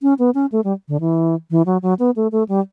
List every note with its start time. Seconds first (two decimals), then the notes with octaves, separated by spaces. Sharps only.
0.02 C#4
0.19 B3
0.35 C#4
0.52 A3
0.64 G3
0.88 D3
1.00 E3
1.51 E3
1.66 F#3
1.82 F#3
1.99 B3
2.16 A3
2.32 A3
2.49 G3